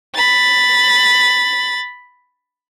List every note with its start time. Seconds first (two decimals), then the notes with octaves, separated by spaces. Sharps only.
0.15 B5 A6